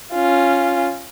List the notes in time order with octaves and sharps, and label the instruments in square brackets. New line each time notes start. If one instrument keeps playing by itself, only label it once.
[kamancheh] C#4 F4